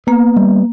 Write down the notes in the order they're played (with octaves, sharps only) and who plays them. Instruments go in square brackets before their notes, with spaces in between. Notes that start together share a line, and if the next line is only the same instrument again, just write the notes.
[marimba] A#3 [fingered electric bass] B3
[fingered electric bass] G3